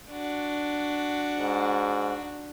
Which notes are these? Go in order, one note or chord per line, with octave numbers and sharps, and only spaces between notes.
D4 F#4
G#2